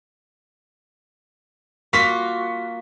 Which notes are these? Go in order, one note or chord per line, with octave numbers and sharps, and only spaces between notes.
A#3 F4 F#4 C#6 B6